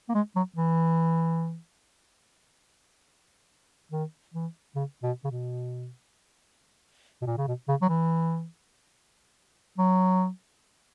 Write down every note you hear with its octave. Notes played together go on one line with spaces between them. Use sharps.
A#3
G#3
F#3
E3
D#3
E3
C#3
B2
C#3
B2
B2
A#2
C#3
B2
C#3
F#3
E3
F#3